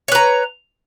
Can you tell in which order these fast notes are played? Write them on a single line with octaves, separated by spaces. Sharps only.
C#5 B4 A#5